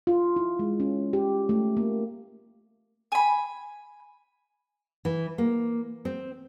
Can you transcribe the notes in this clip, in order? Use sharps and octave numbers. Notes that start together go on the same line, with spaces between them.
F4
E4
G#3
C#4
G4
A3
A#3
G#5 B5
E3
A#3
C4